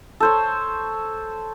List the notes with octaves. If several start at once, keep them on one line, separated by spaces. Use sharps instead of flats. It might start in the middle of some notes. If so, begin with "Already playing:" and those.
A4 C5 C#5